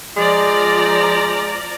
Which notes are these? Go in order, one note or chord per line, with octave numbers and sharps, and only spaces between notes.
F3 G#3 D5 A#5